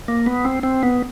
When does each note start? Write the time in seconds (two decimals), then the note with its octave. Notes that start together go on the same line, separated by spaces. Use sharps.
0.08 A#3
0.26 B3
0.45 C4
0.63 C4
0.83 B3